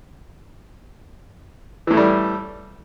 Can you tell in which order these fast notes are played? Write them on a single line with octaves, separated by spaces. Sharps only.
E3 A2 A3 G3